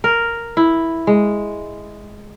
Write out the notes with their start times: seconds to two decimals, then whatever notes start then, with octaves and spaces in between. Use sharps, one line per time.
0.04 A#4
0.57 E4
1.07 G#3